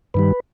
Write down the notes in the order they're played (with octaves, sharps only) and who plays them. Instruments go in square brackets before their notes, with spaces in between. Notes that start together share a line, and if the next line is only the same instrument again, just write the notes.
[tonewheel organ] G2 D#3 G3 B4